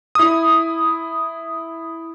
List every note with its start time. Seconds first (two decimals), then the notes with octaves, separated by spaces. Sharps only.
0.15 E4 D#6